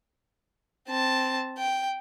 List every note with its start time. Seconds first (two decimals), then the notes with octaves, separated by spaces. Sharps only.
0.88 C4 A5
1.58 G5